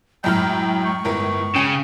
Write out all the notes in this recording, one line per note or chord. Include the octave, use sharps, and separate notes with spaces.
F#2 A2 G#3 G5 F6
C#6
G1 A2 A#4
C#3 G5 G#5